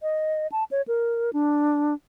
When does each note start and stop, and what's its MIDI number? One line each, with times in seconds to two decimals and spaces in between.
0.02 0.47 75
0.52 0.64 81
0.71 0.82 73
0.88 1.30 70
1.33 1.94 62